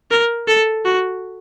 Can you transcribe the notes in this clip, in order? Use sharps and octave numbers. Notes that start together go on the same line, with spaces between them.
A#4
A4
F#4